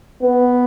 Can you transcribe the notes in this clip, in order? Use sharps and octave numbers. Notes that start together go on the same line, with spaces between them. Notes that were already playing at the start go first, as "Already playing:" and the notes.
B3